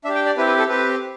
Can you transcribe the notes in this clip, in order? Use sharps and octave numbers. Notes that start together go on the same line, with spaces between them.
D4 G4 E5
G5
D5
C4 E4 G4 B4
B4
A4
C4 G4 B4